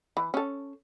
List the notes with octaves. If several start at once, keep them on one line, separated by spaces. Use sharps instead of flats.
E3
C#4 A4